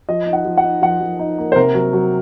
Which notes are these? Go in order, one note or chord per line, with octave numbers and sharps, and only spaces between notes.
F3 D#5
D#4
F#5
F3
F#5
D#4
F3 F#5
F3
D#4
A#3
C5
C3 A#4
F#3
F#3